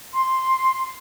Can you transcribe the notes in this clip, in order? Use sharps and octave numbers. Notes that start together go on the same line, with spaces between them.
C6